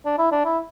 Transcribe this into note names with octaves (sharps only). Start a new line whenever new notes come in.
D4
E4
D4
E4